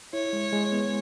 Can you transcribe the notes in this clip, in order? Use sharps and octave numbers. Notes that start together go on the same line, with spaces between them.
E4 C#5
G#3
G#3
B3